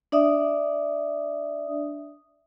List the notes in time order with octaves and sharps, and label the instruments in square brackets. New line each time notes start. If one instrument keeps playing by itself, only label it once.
[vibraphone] D4 D5 E5 D#6